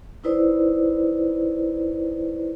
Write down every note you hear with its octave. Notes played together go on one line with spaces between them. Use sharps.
D#4 E4 B4 C5 D5